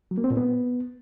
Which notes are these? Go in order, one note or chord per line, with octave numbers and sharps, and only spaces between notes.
F#3
A#3
C4
A#2
B3